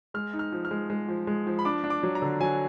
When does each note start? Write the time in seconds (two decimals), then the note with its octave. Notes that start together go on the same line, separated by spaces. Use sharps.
0.14 G#3 F6
0.33 D#4
0.39 F6
0.52 F3
0.65 F6
0.71 G#3
0.90 G#3
1.08 F3
1.27 G#3
1.47 F3
1.59 B5
1.65 D4 D6
1.84 D4
1.90 D6
2.03 F#3
2.15 A#5
2.22 D3
2.40 F#3 G#5